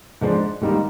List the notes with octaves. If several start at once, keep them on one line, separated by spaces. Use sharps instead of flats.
G#2 F3 G#3 D4
G#2 D#3 G3 A#3 D#4